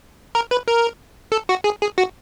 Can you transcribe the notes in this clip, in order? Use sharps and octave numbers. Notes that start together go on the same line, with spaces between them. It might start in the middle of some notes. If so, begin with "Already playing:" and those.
A#4
B4
A#4
A4
F#4
G#4
G#4
F#4